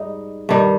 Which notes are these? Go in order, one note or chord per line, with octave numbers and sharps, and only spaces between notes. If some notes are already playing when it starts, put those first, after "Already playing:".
Already playing: G#2 G3 D#4
G2 D#3 G3